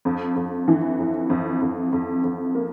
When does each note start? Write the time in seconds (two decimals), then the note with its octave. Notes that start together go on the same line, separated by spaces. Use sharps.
0.05 F2
0.36 F2
0.68 E3
0.99 F2
1.30 F2
1.61 F2
1.93 F2
2.24 F2
2.55 A#3